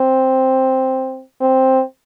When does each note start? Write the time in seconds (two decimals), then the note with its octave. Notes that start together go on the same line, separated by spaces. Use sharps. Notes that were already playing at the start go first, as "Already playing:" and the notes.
Already playing: C4
1.41 C4